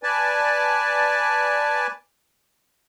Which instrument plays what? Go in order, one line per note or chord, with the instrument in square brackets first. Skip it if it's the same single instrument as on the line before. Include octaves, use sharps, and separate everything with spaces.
[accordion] B4 D5 G#5 A5